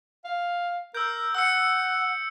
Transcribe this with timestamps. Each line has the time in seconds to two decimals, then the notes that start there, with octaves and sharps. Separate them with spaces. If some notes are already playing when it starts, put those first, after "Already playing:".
0.25 F5
0.95 A#4 E6 G6
1.35 F#5 E6 C#7